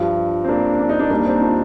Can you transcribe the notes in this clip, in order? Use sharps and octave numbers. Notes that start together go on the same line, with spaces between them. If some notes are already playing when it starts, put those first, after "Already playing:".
Already playing: G2 F3
C4
A#3 D4
D4
D#4
A#3 D4
D#2 D#3 G3 A#3 D4
C4 D#4
D4 F4